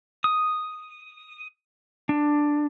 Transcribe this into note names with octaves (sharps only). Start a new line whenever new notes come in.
D#6
D4